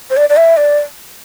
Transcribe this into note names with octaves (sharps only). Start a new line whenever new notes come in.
C5
D5
D5
E5
D5